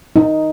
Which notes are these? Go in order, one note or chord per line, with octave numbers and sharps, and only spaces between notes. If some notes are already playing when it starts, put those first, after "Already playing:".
D#4